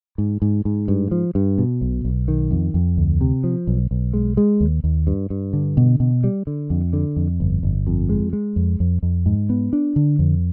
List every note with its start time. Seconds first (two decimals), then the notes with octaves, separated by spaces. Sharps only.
0.18 G#2
0.42 G#2
0.65 G#2
0.88 G2
1.11 F3
1.35 G2
1.58 B2
1.81 B1
2.05 B1
2.28 D#3
2.51 F2
2.74 F2
2.97 D2
3.21 C3
3.44 F3
3.67 B1
3.91 B1
4.14 G#3
4.37 G#3
4.60 D#2
4.84 D#2
5.07 G2
5.30 G2
5.53 D3
5.77 B2
6.00 B2
6.24 G3
6.47 D3
6.70 F2
6.93 D3
7.16 F2
7.40 G1
7.63 G1
7.87 F2
8.09 G#3
8.33 G#3
8.56 F2
8.80 F2
9.03 F2
9.26 G#2
9.50 B3
9.73 D4
9.96 D3
10.19 F2